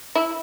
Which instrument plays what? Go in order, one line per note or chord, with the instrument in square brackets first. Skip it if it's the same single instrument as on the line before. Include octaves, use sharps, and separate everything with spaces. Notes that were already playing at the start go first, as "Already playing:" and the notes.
[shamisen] E4